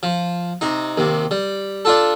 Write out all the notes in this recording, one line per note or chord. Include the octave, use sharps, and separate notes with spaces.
F3
C3 D#4
D#2 C3
G3
D4 F4 A4